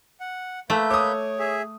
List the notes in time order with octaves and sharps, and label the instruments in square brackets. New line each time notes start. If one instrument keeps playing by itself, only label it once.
[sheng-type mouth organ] F#5
[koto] A3 [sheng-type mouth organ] A#3 B4 G6 [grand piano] E5
[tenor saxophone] C#5 [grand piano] D6 D#6
[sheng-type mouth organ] G#4 E5